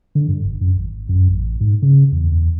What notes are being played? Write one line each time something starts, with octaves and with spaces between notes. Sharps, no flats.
D3
G2
F#1
F#2
G#1
F#2
A1
G#2
C#3
E2
E2